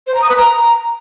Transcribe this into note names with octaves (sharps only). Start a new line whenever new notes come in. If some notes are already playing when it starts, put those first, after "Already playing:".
C5
A#5
D#6
B4
A#5